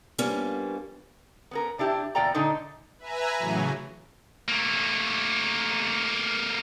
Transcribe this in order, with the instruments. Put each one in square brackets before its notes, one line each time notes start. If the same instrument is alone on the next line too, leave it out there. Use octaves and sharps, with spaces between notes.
[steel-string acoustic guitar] F3 G3 A#3 B3 C#4 D4
[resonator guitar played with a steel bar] B3 C#4 A#4
C3 D4 E4 G4
E2 A#2 D5 G5 A#5
A#2 D3 G#3 D4 D#4
[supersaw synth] B4 E5 G#5 A#5
A2 C#3 E3 F#3
[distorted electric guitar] A3 A#3